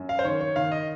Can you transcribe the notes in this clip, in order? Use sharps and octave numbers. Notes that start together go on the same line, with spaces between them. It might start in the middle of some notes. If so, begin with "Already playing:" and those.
Already playing: F#2
F5
C5
D#3 C#5
C#5
D#3 F5
D#5